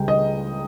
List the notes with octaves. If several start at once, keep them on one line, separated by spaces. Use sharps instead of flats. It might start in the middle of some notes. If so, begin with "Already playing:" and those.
Already playing: C#2 C#3 G3 G5
D#5